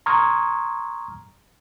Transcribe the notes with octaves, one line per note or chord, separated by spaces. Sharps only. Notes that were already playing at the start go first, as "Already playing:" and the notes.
A#5 C6 C#6 D#6 F6 G#6